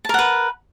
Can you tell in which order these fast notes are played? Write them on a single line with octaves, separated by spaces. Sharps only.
A5 A#4 F#5 B4